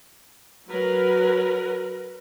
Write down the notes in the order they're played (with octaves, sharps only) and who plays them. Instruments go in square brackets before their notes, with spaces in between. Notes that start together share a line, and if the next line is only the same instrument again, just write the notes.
[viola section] F#3 A#4 B4